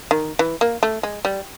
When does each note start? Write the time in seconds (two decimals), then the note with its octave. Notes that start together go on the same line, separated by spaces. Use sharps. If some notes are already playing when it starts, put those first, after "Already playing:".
0.11 D#3
0.39 E3
0.61 A#3
0.83 A3
1.03 G#3
1.25 G3